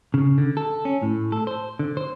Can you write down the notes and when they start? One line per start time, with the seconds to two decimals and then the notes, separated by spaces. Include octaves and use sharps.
0.14 C#3
0.38 D3
0.57 A4
0.85 C#4
1.02 A2
1.32 A4
1.47 C5
1.79 D3
1.97 C5